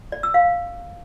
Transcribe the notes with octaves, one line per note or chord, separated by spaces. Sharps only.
D5
E6
F5